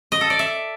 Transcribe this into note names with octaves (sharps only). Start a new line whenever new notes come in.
D#5
A4
D5
E5